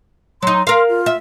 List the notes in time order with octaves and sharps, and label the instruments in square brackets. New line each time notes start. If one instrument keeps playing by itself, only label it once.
[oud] F#3 D#4 [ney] C6
[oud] A#4 F5 [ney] C6
[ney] F4
[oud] E5